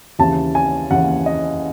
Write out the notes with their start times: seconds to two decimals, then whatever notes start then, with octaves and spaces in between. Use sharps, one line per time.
0.19 D#2 C#3 E3 A5
0.55 G#5
0.91 D#2 C#3 E3 F#5
1.26 D#5